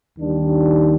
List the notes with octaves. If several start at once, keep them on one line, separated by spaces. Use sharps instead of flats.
D#2 D#3 G3 D4